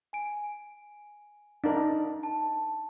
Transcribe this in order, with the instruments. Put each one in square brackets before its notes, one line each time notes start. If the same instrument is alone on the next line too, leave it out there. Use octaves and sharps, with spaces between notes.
[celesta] G#5 D7
[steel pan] D4 D#4 A#4
[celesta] A5